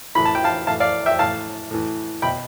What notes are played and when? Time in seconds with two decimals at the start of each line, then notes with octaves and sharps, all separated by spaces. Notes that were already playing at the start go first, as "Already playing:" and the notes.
0.15 A2 E3 B5
0.25 A5
0.35 G5
0.44 F5 A5
0.67 A2 E3 F5 A5
0.80 D5 F5
1.06 E5 G5
1.19 A2 E3 F5 A5
1.71 A2 E3
2.22 B2 G5 B5